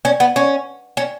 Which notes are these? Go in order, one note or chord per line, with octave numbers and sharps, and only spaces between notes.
C#4
B3
C#4
C#4